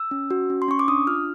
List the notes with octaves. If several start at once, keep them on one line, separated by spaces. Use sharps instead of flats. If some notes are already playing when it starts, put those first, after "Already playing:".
Already playing: E6
C#4
F#4
C#4
C6
C#4 C#6
D6
D4 D#6
F4 F6